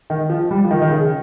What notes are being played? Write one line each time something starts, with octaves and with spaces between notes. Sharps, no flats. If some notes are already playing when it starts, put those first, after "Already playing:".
D#3
F3
G3
F3
D#3
D#3
C#3